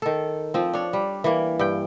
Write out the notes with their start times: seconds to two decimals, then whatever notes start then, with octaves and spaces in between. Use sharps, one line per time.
0.02 D#3 A4
0.54 F3 C4
0.73 D4 C#5
0.93 G3
1.24 E3 A#3
1.59 G2 G5